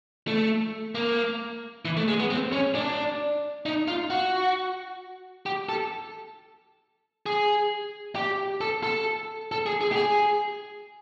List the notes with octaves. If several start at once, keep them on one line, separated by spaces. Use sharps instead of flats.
A3
A#3
E3
A3
G#3
B3
C4
C#4
D4
D#4
F4
F#4
G4
A4
G#4
G4
A4
A4
A4
G#4
G#4
G4
G#4